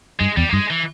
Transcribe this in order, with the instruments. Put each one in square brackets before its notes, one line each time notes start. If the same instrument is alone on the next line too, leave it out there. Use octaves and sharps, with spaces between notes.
[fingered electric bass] G2 [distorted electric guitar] G#3
[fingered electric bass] E2 [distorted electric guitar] G3
[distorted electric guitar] A#3
[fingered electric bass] G2 [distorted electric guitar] G#3
[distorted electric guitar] E3